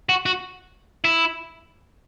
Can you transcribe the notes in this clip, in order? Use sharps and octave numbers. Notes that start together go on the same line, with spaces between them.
F#4
F#4
E4